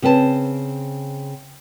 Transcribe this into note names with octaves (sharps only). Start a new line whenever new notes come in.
C#3 C4 B4 A5